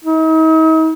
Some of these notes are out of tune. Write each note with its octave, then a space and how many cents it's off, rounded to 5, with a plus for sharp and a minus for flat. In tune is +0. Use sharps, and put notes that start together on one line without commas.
D#4 +45